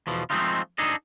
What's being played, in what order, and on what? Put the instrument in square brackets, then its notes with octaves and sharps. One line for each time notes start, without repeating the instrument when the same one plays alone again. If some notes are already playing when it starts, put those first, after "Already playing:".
[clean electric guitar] E2 B2 F3
F3 G#3 A3 C4 D#4 F4
D4 D#4 G#4 A4 D#5